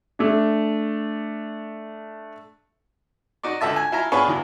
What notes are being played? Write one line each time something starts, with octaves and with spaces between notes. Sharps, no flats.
A3 D4
D#4 F#4 D5
C#2 D3 E5 A5
G#5
E4 F4 G#5 A#5
B3 D4 F4 G#4 B4 C#5
E2 E3